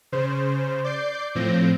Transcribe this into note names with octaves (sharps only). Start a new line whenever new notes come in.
C#3 C5
D5 D6 G6 C7
A2 F3 C4 G6 A#6